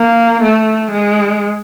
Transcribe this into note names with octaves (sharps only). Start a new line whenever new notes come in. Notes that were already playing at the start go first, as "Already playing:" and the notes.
Already playing: A#3
A3
G#3